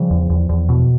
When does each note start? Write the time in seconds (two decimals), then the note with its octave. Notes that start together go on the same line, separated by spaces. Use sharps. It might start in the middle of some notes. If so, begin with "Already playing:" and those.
Already playing: C#3 F3 G3
0.11 E2
0.30 E2
0.49 E2
0.69 B2